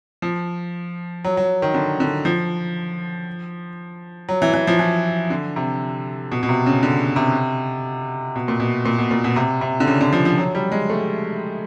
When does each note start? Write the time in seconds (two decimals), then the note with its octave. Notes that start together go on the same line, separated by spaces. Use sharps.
0.22 F3
1.24 F#3
1.37 F#3
1.62 D#3
1.74 D3
2.00 D3
2.25 F3
4.29 F#3
4.42 E3
4.53 E3
4.67 F3
4.79 E3
5.30 D3
5.56 C3
6.32 B2
6.43 B2
6.49 C3
6.66 C#3
6.83 D3
7.16 C3
8.36 B2
8.48 A#2
8.60 B2
8.85 A#2
8.98 B2
9.11 A#2
9.24 B2
9.36 C3
9.61 C3
9.80 D3
9.87 C#3
10.01 D3
10.13 F3
10.25 F3
10.38 F#3
10.55 G3
10.72 G#3
10.90 A3